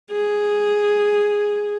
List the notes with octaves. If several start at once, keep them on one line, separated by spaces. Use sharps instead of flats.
G#4